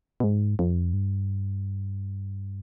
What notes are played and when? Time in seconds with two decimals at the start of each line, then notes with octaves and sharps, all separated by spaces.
0.20 B2
0.24 G#2
0.59 F2
0.93 G2